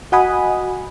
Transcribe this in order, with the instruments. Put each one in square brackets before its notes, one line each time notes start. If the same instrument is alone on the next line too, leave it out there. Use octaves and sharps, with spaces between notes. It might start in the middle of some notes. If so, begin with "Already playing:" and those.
[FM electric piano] F#4 D#5 F#5 G#5 B5 D#6